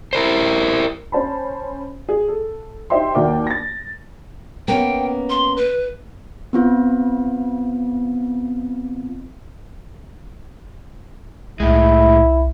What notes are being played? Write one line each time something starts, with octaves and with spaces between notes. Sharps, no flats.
E4 A#4 C5
C#4 C5 A5 B5
G#4
A4
D#4 G4 C5 E5 G5 C6
D#2 A#3 F#4 D5 G5 D6
A6 A#6
A#3 B3 C#4 G5
C6
B4
B3 C4 F4
C2 A2 G#3 E4